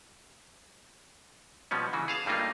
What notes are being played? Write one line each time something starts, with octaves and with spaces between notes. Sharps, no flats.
B2 F3 G3 B3 C#4
C#3 E3 F#4
G#4 F5 A5
G2 G3 A3 A#3 D#4 F4